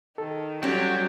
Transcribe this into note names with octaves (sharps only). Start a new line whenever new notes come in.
D#3 A4
F#3 G3 C4 C#4